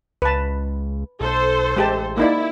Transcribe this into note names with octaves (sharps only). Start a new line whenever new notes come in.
C#2 B4 A5
B1 A4 C5
A1 G#3 G4 A5
A#3 D#4 E4 D5